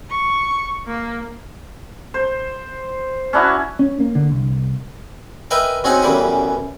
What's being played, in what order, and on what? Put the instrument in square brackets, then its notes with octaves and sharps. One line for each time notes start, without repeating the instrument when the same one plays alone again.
[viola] C#6
A#3
[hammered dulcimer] C5
C#4 D4 E4 F#4
[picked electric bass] C#4
A#3
D3
C2
[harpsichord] A#4 B4 D#5 E5 G5 G#5
F#3 C4 C#4 D#4 G#4 F#5
A1 F#2 E3 G3 B3 G#4